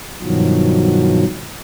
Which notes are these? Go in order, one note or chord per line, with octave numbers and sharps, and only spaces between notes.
G2 B2 D#3 F3 F#3